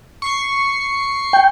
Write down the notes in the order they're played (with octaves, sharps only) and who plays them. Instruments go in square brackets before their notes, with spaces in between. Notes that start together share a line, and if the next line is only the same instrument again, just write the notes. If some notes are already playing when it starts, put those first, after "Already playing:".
[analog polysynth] C#6 C7
[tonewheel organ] G5